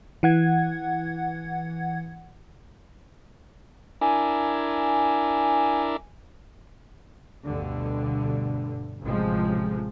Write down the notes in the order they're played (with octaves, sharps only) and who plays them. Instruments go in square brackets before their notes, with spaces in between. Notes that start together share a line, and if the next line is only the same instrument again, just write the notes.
[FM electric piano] E3 F#5 G#6
[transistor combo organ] D4 E4 A#4 [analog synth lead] G#5
[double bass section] D2 G2 B2 D3
A1 C3 F3 G#3